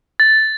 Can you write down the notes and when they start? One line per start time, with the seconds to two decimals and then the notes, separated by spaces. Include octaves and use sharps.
0.20 A6